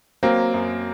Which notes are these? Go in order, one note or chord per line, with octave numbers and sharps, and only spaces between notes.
F#3 A#3 C4
F#2